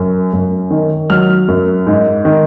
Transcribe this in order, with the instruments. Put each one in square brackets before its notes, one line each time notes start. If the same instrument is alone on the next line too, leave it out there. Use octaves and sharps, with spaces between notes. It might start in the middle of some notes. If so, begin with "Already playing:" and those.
Already playing: [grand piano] F#2
F#2
D#3
F#3 F6
F#2
G#2
D#3